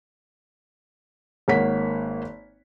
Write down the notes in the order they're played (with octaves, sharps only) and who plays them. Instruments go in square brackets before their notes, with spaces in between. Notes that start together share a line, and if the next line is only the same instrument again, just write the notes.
[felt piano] G#1 A#3 C#5 F#5 B6